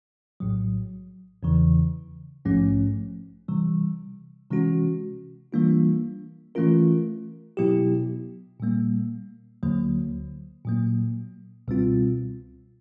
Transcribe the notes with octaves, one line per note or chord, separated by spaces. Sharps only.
A#1 A2 F#3
E2 C#3 E3
A#1 G#2 F3 A3 C#4
C3 E3 G3
C3 E3 G#3 C#4 F#4
E3 G3 A#3 D4 F4
E3 A3 C#4 F4 A#4
B2 F#3 B3 E4 G4
A#2 G3 A#3
D2 D3 F#3 A#3
A#2 F#3 A#3
C#2 B2 G3 C4 F4